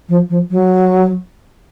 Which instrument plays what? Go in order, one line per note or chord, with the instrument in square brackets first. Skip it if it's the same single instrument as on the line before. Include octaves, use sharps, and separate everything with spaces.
[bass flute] F3
F3
F#3